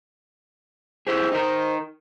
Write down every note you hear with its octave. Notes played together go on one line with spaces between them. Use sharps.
E4 G4 G#4 C5
D#4 A#4